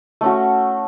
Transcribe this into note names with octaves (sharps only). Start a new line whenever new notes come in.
A3 C#4 F#4